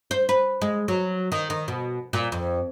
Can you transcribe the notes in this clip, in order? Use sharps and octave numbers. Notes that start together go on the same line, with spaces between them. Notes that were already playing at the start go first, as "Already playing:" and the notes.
C5
B4
G#3
F#3
D#3
D#3
B2
A#2
F2